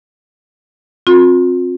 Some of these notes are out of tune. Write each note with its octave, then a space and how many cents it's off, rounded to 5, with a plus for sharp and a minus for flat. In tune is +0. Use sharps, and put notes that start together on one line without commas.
C4 +20 F4 +45